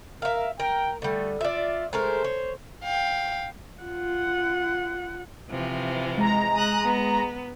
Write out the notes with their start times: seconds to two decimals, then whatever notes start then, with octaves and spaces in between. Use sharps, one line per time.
0.22 A#4 E5 F5
0.60 A#4 G5
1.02 D3 G3 A3
1.41 F4 D5 E5
1.93 G#3 A3 A#4 C5
2.24 C#5
2.84 F5 G5
3.83 F4 F#5
5.50 C3 E3 F3
6.18 G#3 A#5
6.56 D#6 F#6
6.86 B3